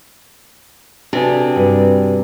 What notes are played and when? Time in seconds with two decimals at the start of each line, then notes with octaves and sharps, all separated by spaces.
1.13 C3 D4 F#4 G#4 A4 B4 D5
1.56 G2 G3